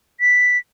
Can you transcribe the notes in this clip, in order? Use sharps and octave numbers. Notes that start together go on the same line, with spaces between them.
B6